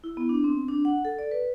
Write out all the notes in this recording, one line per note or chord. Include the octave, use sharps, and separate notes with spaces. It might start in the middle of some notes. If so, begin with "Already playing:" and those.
E4
B3
D4
C4
D4
F#5
A4
D5
B4